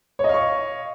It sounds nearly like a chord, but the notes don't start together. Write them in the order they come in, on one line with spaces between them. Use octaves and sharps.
C#5 D#5 F5 C#6